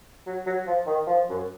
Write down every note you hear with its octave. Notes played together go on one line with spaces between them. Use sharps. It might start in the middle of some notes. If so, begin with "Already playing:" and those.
F#3
F#3
F3
D#3
F3
F#2